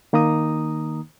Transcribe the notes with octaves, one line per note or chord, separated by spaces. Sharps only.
D#3 A#3 D#4 A#5 D#6